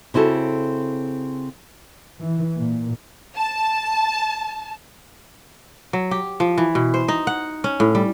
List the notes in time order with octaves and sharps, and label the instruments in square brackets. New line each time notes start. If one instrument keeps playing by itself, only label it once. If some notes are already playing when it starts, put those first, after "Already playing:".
[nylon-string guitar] C#3 C4 E4 F#4 A4
[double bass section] E3
A#2
[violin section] A5
[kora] F#3
G4
F3
E3
B2
C5
D#4
F#5
C#4
A2
G3